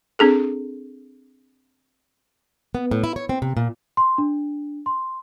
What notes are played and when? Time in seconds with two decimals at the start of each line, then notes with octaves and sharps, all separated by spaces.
0.19 C4 D4 G#4 A4
2.75 B3
2.91 A2
3.04 E4
3.16 C#5
3.29 C4
3.42 C3
3.57 A#2
3.97 C6
4.18 D4
4.86 C6